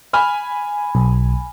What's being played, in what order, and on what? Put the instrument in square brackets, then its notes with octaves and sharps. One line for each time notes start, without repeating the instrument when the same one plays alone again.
[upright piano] G#5 B5 F6
[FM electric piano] B1